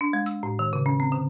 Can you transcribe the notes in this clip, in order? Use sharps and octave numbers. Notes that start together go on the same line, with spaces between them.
D4
G#3
E6
A2
D#3
C#3
C#4
C4
D3